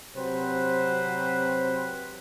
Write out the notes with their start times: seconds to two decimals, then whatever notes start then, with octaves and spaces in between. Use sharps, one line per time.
0.15 C3 F#3 C4 B4 C5